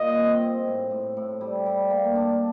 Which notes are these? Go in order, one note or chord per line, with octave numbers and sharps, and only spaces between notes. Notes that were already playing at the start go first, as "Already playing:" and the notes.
Already playing: A#2 G3 D#5
C4
C4
A2
A2
A2
G3
G3
A#3
D4